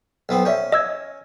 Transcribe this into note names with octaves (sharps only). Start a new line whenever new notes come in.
B1 B3 C4
C#4 C5 D5 E5
D#5 E6 G#6